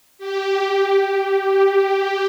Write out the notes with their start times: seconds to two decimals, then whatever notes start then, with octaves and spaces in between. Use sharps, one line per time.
0.18 G4
1.39 G4
1.79 G4